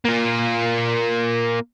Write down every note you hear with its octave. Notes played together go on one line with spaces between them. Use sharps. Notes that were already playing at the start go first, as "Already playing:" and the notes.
A#3 F4